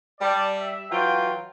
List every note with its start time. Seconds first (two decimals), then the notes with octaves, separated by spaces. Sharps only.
0.20 G3 D5 A5
0.57 E5
0.91 E3 F#3 F4 G5